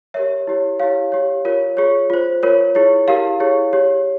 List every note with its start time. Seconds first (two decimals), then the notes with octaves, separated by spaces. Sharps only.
0.14 G4 A#4 C#5 E5
0.47 E4 G4 C#5
0.80 E4 G4 C#5 F5
1.12 G4 C#5
1.45 F4 A#4 C#5
1.77 F4 G#4 C#5
2.10 F4 C5
2.43 F4 A#4 C#5
2.75 E4 G#4 C#5
3.08 E4 G4 A#4 F5
3.40 E4 G#4 C#5
3.73 G4 C#5